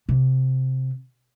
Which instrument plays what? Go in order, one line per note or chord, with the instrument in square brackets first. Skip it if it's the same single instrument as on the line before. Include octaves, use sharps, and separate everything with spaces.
[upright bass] C3